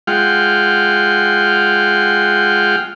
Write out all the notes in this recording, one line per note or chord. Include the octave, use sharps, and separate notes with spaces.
G#3 F4 F#5 G5 F6